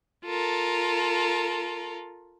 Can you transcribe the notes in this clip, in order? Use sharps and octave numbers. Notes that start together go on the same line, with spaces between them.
F4 A4 A#4